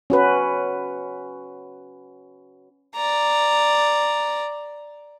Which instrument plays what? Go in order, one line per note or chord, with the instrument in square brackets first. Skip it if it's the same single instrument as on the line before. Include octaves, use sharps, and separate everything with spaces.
[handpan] C#4 F#4 B4
[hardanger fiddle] D5 A#5